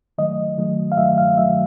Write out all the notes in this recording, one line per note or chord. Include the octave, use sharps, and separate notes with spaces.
D#3 F#3 A3 D#5
D#3 F#3 A3
F5
D#3 F#3 A3 E5
F5
D#3 F#3 A3 E5